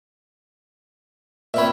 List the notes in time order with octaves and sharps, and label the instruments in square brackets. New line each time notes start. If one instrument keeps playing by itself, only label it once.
[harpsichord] A#2 C4 C#5 [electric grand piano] E5 B5